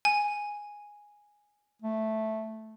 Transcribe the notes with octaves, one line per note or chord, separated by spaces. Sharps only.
G#5
A3